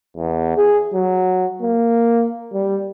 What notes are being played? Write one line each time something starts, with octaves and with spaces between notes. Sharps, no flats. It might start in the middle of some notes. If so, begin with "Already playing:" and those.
E2
G#4
F#3
A#3
G3